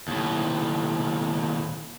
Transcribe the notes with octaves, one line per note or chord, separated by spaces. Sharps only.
D#2 A2